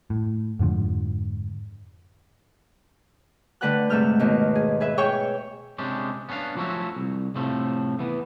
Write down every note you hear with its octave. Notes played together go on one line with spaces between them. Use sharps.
A2
F2 G#2 D3 F3
D3 A3 B4 F#5 G5 F#6
G#2 C3 A3 E6 F6 G6
D#2 B2 D#3
G#4
G#4 B4 E5
G#4 C#5 E5 G5 C#6
C3 G#3 C#4 D4 G4
B3 C#4 D4 C5 F5
F3 F#3 A3 C#4 E4 F#4
C2
A2 C3 F3 A3
E3 B3